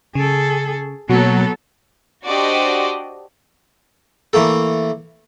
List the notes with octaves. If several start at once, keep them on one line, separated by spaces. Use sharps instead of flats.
C#3 G#4 A4
B2 F#3 A#3 B3 A4
D4 F#4 G4 C5 D5 D#5
E3 A3 A#3 A4